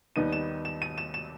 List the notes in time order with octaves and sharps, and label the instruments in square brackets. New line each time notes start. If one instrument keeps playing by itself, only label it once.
[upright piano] D#2 D#3 G3 B3 D#4 D#7
E7
E7
D#7
E7
E7